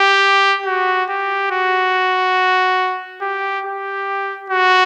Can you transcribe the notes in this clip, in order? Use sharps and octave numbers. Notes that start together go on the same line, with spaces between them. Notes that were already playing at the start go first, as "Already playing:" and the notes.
Already playing: G4
F#4
G4
F#4
G4
G4
F#4